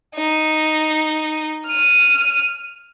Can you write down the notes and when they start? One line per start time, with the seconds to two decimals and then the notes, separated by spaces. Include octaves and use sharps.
0.16 D#4
1.67 F6 D#7